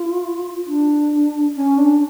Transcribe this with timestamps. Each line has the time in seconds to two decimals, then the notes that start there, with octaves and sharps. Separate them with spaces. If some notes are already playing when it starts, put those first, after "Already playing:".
Already playing: F4
0.67 D4
1.56 C#4
1.78 D4